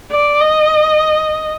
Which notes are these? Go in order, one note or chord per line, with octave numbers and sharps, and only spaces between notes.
D5
D#5